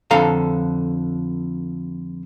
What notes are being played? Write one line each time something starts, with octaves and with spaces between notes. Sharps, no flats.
F2 D3 A4 F5 A#5